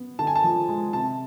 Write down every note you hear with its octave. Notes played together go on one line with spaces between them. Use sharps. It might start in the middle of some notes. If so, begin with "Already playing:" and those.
Already playing: B3
D3 A5
G#5
A5
F3
G#3
C3 A5